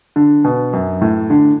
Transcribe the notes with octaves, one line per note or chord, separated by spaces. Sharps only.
D3
B2
F#2
A2
D3